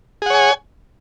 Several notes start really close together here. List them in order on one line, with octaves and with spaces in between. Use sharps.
G#4 F#5 C#5 G#5